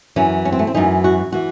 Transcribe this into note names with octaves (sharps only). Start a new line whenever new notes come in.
F#2 E3 C#4
C#4
C4
A3
C4
F#2 E3 D#4
F#4
E3 F#4